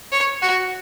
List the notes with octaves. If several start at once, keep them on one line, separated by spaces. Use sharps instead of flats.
C#5
F#4